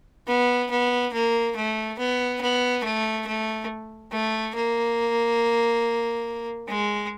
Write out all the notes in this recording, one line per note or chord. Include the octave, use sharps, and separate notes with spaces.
B3
B3
A#3
A3
B3
B3
A3
A3
A3
A#3
G#3